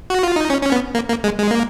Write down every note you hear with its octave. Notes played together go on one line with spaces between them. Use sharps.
F#4
F4
D#4
C#4
C#4
B3
A#3
A#3
G#3
G#3
A#3